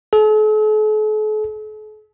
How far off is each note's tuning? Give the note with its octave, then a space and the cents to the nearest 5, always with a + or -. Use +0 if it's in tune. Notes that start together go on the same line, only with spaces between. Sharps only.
A4 -45